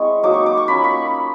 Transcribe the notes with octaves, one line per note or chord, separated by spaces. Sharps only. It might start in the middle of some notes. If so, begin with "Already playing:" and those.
Already playing: G#3 C4 E4 C#6
F#3 A#3 D#4 D6
C#6
D6
C#6
A#3 C#4 F4 B5
C#6